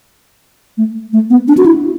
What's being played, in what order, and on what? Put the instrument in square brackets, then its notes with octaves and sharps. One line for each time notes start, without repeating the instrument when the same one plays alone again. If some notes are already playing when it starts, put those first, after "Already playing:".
[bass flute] A3
A3
B3
D4
F#4
E4